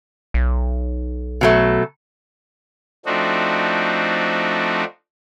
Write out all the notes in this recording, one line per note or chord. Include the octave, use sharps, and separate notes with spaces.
B1
B2 F#3 A3
F3 A3 C4 D4 D#4 F#4